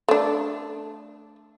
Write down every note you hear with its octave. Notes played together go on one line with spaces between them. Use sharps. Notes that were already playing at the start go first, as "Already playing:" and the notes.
A3 D4